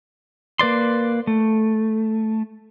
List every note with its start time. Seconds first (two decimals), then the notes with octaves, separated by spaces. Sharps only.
0.59 A#3 B4 D5 C6
1.27 A3